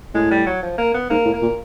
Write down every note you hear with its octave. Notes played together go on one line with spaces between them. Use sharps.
A2 G#3
G3
F#3
F3
A#3
B3
G#2 A#3
A2
A#3
A#2